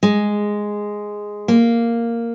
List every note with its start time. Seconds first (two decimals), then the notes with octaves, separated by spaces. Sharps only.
0.03 G#3
1.48 A#3